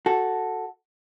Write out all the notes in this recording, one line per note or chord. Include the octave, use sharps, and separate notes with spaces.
F#4 A4